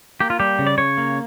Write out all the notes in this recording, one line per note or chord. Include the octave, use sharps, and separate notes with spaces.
A#3 G4
F4
G3 G4
C#3
D5
C#3 C#5
A#3